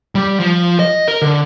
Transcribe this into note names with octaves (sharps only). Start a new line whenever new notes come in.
G3
F3
D#5
A#4
D3